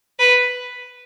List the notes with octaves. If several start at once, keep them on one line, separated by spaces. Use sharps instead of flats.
B4